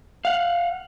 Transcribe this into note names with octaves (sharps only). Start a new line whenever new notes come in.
F5 F#5